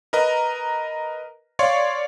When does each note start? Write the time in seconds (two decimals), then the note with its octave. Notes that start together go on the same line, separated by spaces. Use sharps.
0.13 A#4 B4 D#5 A#5
1.59 C#5 D5 F5 C6 C#6